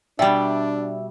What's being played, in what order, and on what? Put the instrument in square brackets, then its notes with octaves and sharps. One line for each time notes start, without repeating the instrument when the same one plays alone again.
[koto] B2 G3 [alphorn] D4 [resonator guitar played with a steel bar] D5 G5 [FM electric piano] E5